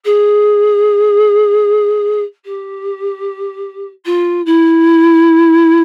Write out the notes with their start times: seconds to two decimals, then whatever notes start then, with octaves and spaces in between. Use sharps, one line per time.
0.05 G#4
2.44 G4
4.05 F4
4.45 E4